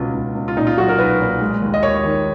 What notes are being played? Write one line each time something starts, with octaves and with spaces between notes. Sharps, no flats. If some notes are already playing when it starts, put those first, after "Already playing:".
Already playing: C#2 B2 F4
C#2
C#2
F4
A#2 D#4
F4
F#3 F#4
A#4
B1 B4
A#2
G#3
D#2
D#5
D#2 C#5
D#3